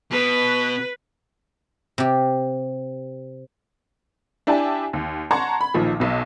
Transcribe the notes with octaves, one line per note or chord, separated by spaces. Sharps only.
B2 B4
C3 G4
D4 E4 G4 G#5 A5
D#2
F#5 A5 A#5 C6 C#6 G#6
B5
B1 A#2 D#3 F3
B1 B2